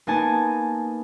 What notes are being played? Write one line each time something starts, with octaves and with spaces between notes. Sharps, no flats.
A#3 B3 D#4 D#5 G#5 A5